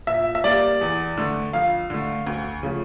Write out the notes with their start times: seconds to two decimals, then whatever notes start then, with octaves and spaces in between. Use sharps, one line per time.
0.07 A#2 E5
0.35 E5
0.44 G3 A#3 D5
0.81 E2
1.17 D3 A3
1.53 F2 F5
1.90 D3 A3
2.27 D2
2.63 C#3 F3 A3